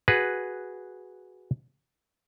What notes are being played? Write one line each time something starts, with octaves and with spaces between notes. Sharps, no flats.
F#4 G#4 B4